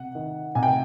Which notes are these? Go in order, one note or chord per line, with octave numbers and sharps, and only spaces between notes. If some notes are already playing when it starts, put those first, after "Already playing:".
Already playing: C3 F#5
D#3
C3 G#5
G5